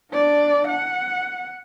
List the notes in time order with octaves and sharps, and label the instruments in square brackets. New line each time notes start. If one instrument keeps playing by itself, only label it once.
[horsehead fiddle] D4 D5
F#5